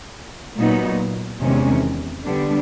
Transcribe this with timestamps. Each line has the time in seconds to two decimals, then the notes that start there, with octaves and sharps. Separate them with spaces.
0.57 A#2 F#3 B3 D#4
1.41 E2 C3 D#3 G#3 C#4
2.25 D3 G3 B3 D4